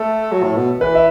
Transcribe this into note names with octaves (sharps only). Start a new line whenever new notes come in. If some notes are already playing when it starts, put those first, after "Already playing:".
Already playing: A3 A4
F#3
A2
B2
E3 B4
E5